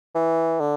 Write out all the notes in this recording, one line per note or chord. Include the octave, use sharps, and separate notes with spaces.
E3
D3